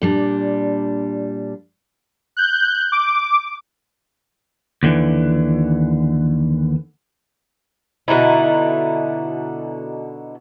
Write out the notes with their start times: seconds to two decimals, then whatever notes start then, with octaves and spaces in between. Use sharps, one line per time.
0.02 A#2 G3 D4
2.37 F#6 G6
2.92 D6
4.83 D#2 D3 E3
8.08 B2 D3 D#4 E4